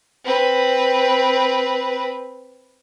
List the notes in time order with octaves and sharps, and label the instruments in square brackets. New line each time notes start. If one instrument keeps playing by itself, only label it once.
[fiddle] C4 B4